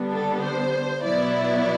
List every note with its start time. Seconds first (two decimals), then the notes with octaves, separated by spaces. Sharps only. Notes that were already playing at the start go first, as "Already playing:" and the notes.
Already playing: D3 G3 B3 D4
0.12 A4
0.42 C5
1.03 B2 F#3 B3 E4 D5
1.34 D5